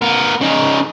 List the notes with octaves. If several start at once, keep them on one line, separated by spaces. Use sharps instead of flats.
B3 A#4
C#3 D#4